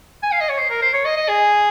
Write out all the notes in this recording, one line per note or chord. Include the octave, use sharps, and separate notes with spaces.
G#5
F5
D#5
C#5
C5
A#4
C5
C#5
D#5
D#5
G#4